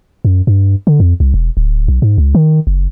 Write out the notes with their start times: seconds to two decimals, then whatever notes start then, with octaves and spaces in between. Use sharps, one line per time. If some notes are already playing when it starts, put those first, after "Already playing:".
0.25 F#2
0.47 G2
0.87 D3
1.00 F2
1.20 C2
1.34 E1
1.57 D1
1.88 B1
2.02 G#2
2.18 C#2
2.35 D#3
2.67 F#1